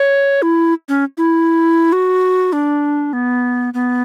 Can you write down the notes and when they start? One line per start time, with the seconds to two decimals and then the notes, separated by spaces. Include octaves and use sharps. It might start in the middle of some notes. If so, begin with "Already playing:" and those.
Already playing: C#5
0.42 E4
0.89 C#4
1.17 E4
1.92 F#4
2.53 D4
3.13 B3
3.74 B3